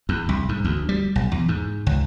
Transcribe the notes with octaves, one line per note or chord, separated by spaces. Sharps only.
E2
C2
G#2
D2
G3
B1
E2
G#2
C#2